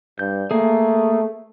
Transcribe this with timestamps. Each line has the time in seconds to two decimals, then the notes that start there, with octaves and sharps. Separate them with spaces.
0.19 G2 G6
0.51 A3 A#3 G#4